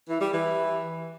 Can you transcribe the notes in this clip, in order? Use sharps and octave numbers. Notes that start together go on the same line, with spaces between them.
E3
G3
E3